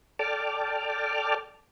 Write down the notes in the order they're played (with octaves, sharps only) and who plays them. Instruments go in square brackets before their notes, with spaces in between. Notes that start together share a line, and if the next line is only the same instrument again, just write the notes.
[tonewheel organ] A4 D5 G5 A5 D6 F6